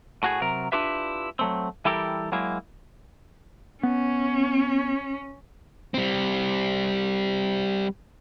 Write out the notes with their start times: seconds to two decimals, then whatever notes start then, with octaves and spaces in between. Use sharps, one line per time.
0.23 A2 F#4 G#4
0.42 C3 F#3 A#4
0.72 D4 E4 F4 G4 B4 E5
1.39 F#3 A3 C4
1.85 E3 G3 E4 G4 A4 A#4
2.32 F#3 G#3 A#3 E4
3.83 B3 C#4
5.94 G3 C4